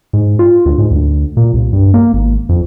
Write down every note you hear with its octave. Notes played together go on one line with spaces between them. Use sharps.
G#2
F4
D2
G#2
D2
A#2
C2
G2
A#3
G#1
F2